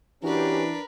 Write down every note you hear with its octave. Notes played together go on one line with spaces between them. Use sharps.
E3 C#4 D4 F#4 G4 A#4 B4